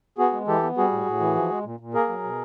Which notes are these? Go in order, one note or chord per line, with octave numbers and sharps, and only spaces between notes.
B3 F#4 G#4
G#3
E3 G4 A4
B3
G3 F#4 G#4
A2
A2
E3
F3
G#3
A#2
A#2
A#3 G#4 A#4
F#3
B2